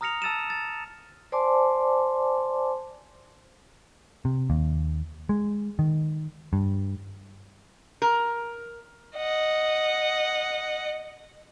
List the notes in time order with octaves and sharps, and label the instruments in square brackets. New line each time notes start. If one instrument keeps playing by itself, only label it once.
[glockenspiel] A#5 D#6 F6 A#6 C#7 F7
A5 E6 A6 D#7 E7
A6
[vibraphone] C5 D5 G#5 A5 C6 D6
[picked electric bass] C3
D#2
G#3
D#3
G2
[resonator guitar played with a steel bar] A#4
[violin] D#5 F#5